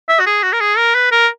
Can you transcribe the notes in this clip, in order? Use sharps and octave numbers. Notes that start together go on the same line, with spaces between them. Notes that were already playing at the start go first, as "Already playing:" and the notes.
E5
F#4
G#4
F#4
A#4
G#4
A#4
B4
A#4